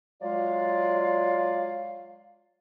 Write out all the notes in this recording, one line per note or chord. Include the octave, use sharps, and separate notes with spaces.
F#3 G#3 F4 D5 F5